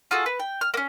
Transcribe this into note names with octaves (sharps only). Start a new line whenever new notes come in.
F4 F#4 G#4 A4
B4
G5
F6
A#3 C#4